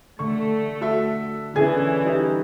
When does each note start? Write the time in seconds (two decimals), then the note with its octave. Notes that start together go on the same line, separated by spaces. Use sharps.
0.19 D3 A3 C#6
0.81 F#4 A4 E5
1.56 D3 E3 C#4 G#4 G#6
2.05 G3 D#4